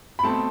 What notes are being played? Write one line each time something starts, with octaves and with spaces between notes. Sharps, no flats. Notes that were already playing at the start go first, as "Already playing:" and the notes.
B5
B2 A3 C4 A5